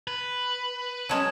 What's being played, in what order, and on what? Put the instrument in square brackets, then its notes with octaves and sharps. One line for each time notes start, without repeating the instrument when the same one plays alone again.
[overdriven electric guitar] B4
[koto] F#3 G#3 C#4 [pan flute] A5